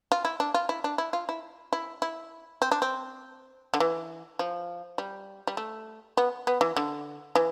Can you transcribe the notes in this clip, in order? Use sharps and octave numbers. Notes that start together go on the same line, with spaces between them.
F4
E4
D4
F4
E4
D4
E4
F4
E4
E4
E4
C4
D4
C4
D3
E3
F3
G3
G3
A3
B3
B3
E3
D3
E3